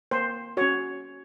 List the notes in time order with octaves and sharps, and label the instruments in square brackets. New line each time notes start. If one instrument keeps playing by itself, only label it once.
[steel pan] A#3 C5
C#4 F#4 C#5